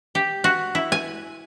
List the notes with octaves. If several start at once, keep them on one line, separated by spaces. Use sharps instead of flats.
G4
F#4
E4
G#5